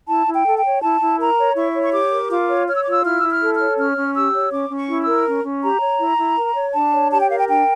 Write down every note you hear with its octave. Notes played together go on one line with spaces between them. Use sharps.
E4 A5
E4
G5
A4
G5
C#5
E4 A5
E4
A#4 A#5
C#5
E4 C#6
C#5
C#6
G4 D6
A#4
F4 D6
C#5
C#5 F6
E6
F4 D6
E6
E4 F6
E4 E6
F6
A4
F6
C#5
C#4 F6
C#4
G4 E6
C#5
C#4 D6
C#4
C#6
E4
E6
A#4
C#4
C#4
G4 A#5
C#5
E4
E4
A#4
C#5
D4 A5
C#5
G4 A5
G5
A#4 F5
G5
D4 G5